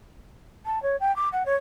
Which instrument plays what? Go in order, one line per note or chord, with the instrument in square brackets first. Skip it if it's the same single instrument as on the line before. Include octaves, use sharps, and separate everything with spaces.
[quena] A5
C#5
G5
D6
F#5
C#5